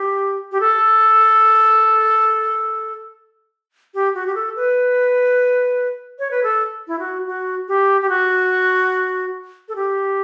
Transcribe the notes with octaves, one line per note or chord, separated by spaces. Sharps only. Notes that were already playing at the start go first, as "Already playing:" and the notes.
Already playing: G4
G4
A4
G4
F#4
G4
A4
B4
C#5
B4
A4
E4
F#4
F#4
G4
G4
F#4
A4
G4